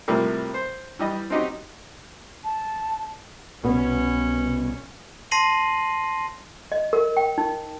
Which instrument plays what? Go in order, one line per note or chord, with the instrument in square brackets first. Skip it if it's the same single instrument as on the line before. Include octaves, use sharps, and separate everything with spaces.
[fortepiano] A2 C3 F3 G3 A#3
C5
E3 G3 D#5
C4 C#4 D#4 F#4 G4
[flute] A5
[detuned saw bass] C2 [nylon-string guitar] B2 B3 [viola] C#4
[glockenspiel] A5 C6 A#6 C7 D#7 F#7
[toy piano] D#5
A#4
G5
D#4